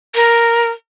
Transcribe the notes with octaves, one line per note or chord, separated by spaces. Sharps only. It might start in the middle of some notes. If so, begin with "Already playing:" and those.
A#4